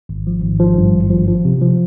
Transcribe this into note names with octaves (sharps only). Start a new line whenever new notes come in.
G#1
F3
G#1
F3
G2
G#1
F3
F3
C3
F3